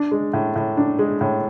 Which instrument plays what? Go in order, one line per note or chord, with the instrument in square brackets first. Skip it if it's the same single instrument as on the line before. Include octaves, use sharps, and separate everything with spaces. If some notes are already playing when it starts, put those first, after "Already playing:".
Already playing: [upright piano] D4
G#3
A2
A2
D4
G#3
A2